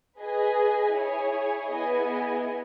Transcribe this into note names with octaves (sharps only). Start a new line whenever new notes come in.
G#4 B4 D#5 G#5
E4 G#4 C#5 G#5
B3 E4 G#4 D#5 G#5